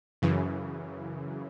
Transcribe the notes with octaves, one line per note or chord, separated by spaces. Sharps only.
F#2 C#3 E3